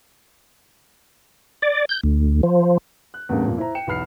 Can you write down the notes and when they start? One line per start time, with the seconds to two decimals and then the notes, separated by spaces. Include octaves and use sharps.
1.62 D5
1.89 G6
2.03 D2
2.43 F3
3.14 F#6
3.29 E2 A2 C#3 G3 A#3 D4
3.44 F2 A#2
3.58 E4 C5 A#5
3.75 G5 C#7 E7
3.87 B1 E2 B5 F6 C7